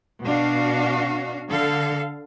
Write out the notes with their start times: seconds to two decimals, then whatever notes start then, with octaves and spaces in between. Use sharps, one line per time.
0.24 B2 D4 F#4 F5
1.49 D3 A4 F5